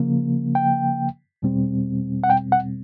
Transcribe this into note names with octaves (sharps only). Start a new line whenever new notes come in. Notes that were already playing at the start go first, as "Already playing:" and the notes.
Already playing: C#3 F3 A#3
G5
E2 B2 G3 C4
F#5
G5
F#5